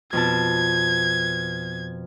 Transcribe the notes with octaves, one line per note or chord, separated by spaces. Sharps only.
F2 B2 A5 G#6